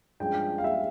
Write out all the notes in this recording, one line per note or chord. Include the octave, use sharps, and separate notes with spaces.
G2 F3 G#3 C#4 G5
F5
E5